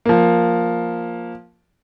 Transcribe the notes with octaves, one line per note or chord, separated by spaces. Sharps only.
F3 A#3